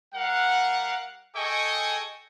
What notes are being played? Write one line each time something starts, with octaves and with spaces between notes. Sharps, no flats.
G3 A#4 F5 F#5
G#4 A4 D#5 G5 G#5 C#6